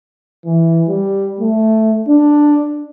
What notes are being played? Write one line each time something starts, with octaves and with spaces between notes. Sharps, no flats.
E3
G3
A3
D4